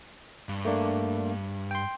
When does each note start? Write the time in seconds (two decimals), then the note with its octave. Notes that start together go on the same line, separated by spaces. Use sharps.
0.49 G2
0.65 A3 A#3 D4
1.71 G5 C6